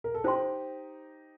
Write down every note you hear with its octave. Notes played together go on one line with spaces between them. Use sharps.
A#4
A4
D#4 G4 C5 G5 C6